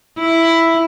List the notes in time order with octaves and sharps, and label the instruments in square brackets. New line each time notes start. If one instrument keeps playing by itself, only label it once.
[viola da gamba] E4